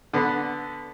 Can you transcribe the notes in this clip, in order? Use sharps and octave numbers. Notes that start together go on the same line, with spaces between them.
D3 B3